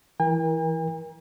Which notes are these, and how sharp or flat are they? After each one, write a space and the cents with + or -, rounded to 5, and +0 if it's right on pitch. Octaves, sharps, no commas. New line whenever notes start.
E3 +0 A#4 +30 G#5 -45